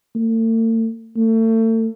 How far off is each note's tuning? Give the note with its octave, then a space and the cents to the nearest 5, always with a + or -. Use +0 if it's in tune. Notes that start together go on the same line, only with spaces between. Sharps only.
A3 +45
A3 +35